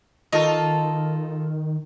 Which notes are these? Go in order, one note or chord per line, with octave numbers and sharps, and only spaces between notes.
D#3 D#4 F4 A4 A#4 D#5 C#6